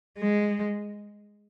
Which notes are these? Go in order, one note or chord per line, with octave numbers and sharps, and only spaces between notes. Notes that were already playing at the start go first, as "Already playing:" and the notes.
G#3